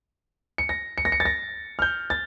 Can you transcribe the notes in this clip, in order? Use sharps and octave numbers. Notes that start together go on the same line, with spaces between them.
C#7
A#6
C#7
A#6
C#7
A6
A#6
F6
G6
A6